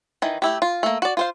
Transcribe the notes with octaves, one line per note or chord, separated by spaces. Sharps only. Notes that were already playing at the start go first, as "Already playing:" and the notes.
D#3 E3
A3 E4 G4
F4
A3 A#3
F#4 D5
F4 C5 F5